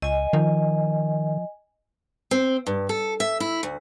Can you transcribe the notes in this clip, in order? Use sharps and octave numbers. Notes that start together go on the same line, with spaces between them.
C#2 D#5 G#5
D#3 F3
C4
G2
A4
E5
E4
D2